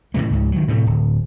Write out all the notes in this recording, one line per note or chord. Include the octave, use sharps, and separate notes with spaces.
A2 C3 E3 A3
C#2 G#2
D#3 F#3
A2 C3 F#3 A3
D1